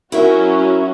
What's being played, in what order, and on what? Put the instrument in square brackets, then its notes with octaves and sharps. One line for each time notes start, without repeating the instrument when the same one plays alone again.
[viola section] F#3 C#4 F#4 [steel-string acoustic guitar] E4 A#4 E5